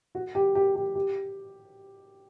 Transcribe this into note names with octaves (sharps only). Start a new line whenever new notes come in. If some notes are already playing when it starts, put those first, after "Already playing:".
F#4
G4
G4
G4
G4